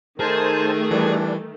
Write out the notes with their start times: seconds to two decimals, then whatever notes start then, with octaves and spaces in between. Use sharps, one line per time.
0.20 D#3 A3 D#4 G#4 A#4 C5 G#5 A5
0.91 E3 G3 D4